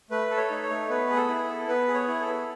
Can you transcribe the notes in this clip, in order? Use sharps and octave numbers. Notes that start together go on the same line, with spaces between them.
A3 B4
A4
C#5
D#4
C#5
A3
B3 B4
G#4
A4
E4
A4
B3
B3 B4
G#4
C#5
E4
A4
B3